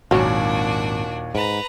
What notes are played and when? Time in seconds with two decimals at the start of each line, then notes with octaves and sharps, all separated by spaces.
0.11 G#1 D#2 A#2 F#3 C#4 D4 F#4
1.35 G#2 B4 A#5